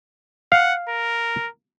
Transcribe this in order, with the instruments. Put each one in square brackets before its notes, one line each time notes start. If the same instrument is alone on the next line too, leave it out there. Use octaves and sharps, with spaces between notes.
[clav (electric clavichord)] F5 [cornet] F#5
[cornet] A#4